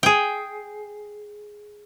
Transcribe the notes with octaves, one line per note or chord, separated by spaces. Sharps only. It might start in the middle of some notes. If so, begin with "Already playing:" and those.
G#4 G5